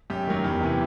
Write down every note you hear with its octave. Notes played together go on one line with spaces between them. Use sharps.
F#2 G4
D#3 F#3
E2 G4
C3 E3